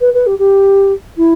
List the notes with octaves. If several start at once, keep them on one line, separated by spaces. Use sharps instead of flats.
B4
B4
G4
G4
E4